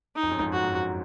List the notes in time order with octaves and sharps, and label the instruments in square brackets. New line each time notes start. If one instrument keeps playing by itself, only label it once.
[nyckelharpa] D#4
[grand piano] F2
F#2
F2 G#2
[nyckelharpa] F#4
[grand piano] F#2